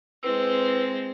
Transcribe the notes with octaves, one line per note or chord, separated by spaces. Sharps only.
G#3 C4 E4 B4 E6